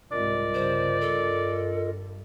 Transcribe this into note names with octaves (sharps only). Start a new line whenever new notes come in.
C2 G#2 C3 F4 A#4 D5 D#5
G2 C#3 C5
G2 A4